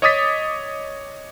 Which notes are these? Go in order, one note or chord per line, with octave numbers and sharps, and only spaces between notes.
C#5 D#5 D6 D#6 A6 B6